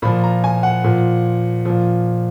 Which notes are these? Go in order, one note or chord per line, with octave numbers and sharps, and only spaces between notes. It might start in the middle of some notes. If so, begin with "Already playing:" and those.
A#2 F3 B5
A#5
G#5
F#5
A#2 F3
A#2 F3